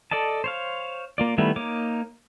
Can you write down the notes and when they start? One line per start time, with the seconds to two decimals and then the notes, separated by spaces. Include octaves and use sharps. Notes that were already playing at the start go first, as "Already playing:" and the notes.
0.11 A4 D5 D#5 A5
0.44 C5 C#5 F5
1.18 A#3 F4 D5
1.38 D#3 G3 A3 B3 E4
1.56 A#3 D#4 C#5 D6